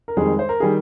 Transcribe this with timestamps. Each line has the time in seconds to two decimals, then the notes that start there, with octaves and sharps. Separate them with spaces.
0.08 A#4
0.17 F2 D#3 G3 G#3 G#4
0.39 C5
0.49 A#4
0.60 D#3 G3 G#4